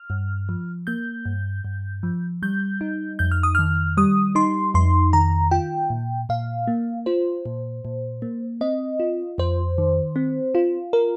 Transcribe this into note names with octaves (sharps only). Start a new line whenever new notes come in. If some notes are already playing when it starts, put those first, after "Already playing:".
Already playing: F6
G2
F3
A#3 G6
G2
G2
F3
G3 G6
D#4
F2 G6
F6
D#6
D#3 F6
G3 D#6
D#4 C6
F2 C6
D#3 A#5
F4 G5
A#2
A#2 F5
A#3
F4 C5
A#2
A#2
A#3
C4 D#5
F4
F2 C5
D#3
C4
F4
A#4